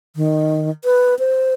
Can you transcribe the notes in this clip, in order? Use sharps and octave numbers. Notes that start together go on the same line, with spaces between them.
D#3
B4
C5